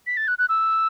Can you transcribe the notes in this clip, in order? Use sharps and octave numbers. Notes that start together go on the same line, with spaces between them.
B6
A6
F#6
F#6
E6